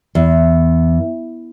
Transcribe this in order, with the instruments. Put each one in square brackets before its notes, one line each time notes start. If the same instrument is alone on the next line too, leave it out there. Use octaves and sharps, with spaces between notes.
[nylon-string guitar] E2